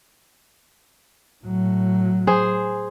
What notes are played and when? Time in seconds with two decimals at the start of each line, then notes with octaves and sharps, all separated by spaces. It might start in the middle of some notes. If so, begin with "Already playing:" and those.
1.45 A2 F#3
2.27 G#4 C5